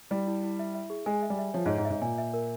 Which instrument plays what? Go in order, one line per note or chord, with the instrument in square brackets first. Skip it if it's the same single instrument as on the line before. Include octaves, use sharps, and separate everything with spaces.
[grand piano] G3 [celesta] E4
[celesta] E4
E4
E5
E5
G#4
[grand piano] G#3 [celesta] G#5
[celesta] E5
[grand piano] G3
[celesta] E5
[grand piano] F3 [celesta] C#5
[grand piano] G#2
[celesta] C#5
[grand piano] G#2
[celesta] E5
[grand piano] G#2
[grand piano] A#2 [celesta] G#5
[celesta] E5
A#4